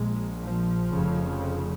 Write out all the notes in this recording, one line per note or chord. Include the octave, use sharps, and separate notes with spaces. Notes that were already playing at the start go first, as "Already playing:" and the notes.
Already playing: A#1 A#2 G#3
F3
F1 F2 C#3